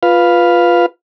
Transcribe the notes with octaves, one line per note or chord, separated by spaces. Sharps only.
F4 B4 F5